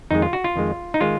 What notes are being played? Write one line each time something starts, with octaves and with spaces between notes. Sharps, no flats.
F2 D#3 G#3 D#4
F4
F#4
F4
F2 D#3 G#3
D#4
D#3 G#3 F4